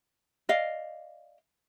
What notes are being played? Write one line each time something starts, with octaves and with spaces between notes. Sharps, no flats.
D5 D#5 F5